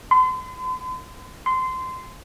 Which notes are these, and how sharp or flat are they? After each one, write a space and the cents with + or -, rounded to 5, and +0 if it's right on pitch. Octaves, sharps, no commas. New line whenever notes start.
C6 -40
C6 -20